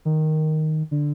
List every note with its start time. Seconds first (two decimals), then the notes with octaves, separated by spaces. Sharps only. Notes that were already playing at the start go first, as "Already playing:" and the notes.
0.05 D#3
0.91 D3